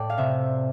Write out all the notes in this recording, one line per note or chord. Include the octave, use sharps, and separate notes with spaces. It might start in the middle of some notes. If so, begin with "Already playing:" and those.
Already playing: A2 D5 G5 A5
F5
C3 E5